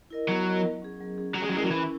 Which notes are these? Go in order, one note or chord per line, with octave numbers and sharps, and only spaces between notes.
E4 A#4 D#5
F#3 B3
E4 A#4 D#5
F#3
C#4 G#4
F#3
C#4 G#4
F#3 C#4
G#3
F#3
G#3 E4 A#4
F#3
E3 C#4